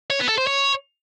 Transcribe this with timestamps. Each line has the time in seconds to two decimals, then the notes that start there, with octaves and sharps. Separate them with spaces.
0.10 C#5
0.20 B3
0.29 A4
0.38 C5
0.47 C#5